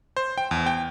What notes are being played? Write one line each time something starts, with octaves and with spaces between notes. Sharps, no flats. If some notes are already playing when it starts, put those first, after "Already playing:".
C5
G5
E2
G5